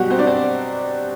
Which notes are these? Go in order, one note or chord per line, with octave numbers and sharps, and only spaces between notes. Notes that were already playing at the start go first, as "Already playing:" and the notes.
Already playing: B2 F#3 G3 B3 F#4 G4
C4 C5
D4 D5
C4 C5